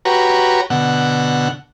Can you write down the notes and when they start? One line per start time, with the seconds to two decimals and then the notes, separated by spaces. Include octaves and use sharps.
0.05 F#4 G4 B4 C#5 A#5
0.70 B2 D3 F#5